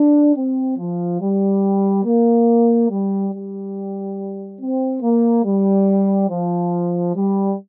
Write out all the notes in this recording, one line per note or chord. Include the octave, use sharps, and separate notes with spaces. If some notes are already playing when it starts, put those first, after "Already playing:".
Already playing: D4
C4
F3
G3
A#3
G3
G3
C4
A#3
G3
F3
G3